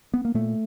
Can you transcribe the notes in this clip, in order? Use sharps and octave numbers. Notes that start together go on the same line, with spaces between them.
B3
A#3
A#2 A3